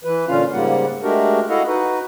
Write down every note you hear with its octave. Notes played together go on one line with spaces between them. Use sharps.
E3 B4
A#2 D3 C#4 F4 F5
G#2 C#3 G3 A#3 F#5
G#3 A3 D4 F#4 G4 A#4
E4 F#4 A4 D#5 F5 F#5
D#4 F#4 B4